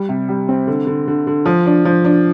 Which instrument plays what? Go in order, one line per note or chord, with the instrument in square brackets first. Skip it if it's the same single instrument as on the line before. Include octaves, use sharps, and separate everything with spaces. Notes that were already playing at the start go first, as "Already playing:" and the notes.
Already playing: [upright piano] G3
C3
G3
C4
D3
D3
D3
D3
F3
D4
F3
D4